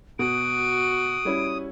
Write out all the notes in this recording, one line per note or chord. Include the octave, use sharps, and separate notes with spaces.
B2 F#4 D#6 D7
G3 C#4 E4